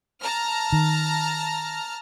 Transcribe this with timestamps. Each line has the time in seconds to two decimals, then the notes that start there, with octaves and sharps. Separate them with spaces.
0.21 A5 A#5 F6
0.73 D#3